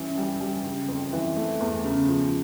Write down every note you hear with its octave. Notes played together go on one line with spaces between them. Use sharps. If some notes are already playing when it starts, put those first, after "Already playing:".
Already playing: G2 E3 C#4
G3
G3
C#3
F2
E3
A3
E2
C#3
F3